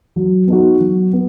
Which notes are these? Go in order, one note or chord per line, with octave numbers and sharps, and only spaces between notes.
F#3
B3 D#4 F#4
F#3
B3